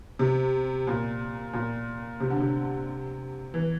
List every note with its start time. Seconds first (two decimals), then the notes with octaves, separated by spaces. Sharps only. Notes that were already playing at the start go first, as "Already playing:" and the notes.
0.19 C3
0.87 A#2
1.53 A#2
2.20 C3
2.30 D3
2.40 C3
3.54 E3